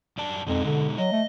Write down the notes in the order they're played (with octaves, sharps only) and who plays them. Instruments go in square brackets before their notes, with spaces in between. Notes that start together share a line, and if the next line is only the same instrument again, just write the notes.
[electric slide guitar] F#2 D5 A5
[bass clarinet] F2 [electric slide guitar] B2 G#3 D#4
[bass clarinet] D3
[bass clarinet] F#3 [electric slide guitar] D#5
[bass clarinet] A3